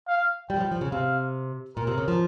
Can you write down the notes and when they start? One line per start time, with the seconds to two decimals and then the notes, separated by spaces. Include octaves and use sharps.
0.08 F5
0.50 G3 G5
0.56 F3
0.61 G3
0.71 F3
0.81 C#3
0.92 C3 F5
1.76 A#2 A#4
1.87 C3
1.98 C#3
2.08 F3